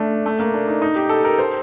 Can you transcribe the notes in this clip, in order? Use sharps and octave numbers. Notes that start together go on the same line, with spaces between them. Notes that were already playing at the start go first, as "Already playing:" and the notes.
Already playing: A3 D4
A3
A#3
D4
D#4
D#4
G4
A4
A#4
C5